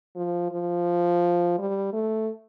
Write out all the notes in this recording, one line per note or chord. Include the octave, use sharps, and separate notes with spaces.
F3
F3
G3
A3